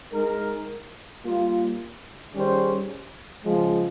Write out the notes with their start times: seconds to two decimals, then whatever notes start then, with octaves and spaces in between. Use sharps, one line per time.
0.13 G#3 D#4 A#4
1.23 G3 A#3 F4
2.34 D#3 G3 C#4 G#4 C5
3.45 C#3 F3 G#3